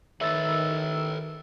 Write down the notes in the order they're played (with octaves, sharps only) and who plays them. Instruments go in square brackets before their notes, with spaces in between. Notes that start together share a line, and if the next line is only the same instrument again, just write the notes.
[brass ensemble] D#3 [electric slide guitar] A4 B4 C#5 [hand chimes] E5 A6 [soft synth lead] E6